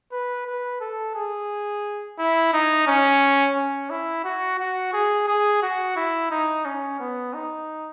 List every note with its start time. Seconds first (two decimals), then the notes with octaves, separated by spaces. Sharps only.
0.12 B4
0.47 B4
0.81 A4
1.15 G#4
2.18 E4
2.53 D#4
2.87 C#4
3.56 C#4
3.90 E4
4.24 F#4
4.59 F#4
4.93 G#4
5.28 G#4
5.62 F#4
5.96 E4
6.31 D#4
6.65 C#4
7.00 B3
7.34 D#4